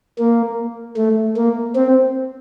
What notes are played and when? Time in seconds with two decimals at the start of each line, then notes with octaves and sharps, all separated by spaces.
0.18 A#3
0.97 A3
1.37 A#3
1.76 C4